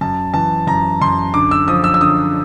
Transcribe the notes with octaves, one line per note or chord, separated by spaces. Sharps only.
F#2 A5
E3 A5
F#2 A#5
F#2 C6
D3 D6
E6
F3 D#6
E6
E6
D3 D#6